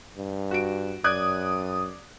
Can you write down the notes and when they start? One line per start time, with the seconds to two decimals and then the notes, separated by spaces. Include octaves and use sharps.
0.17 G2
0.51 F#4 D7
1.04 F#2 D5 D#6 F#6 G#6